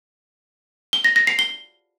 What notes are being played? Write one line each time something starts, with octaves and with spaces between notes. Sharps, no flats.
G7
A#6
A#6
C7
G7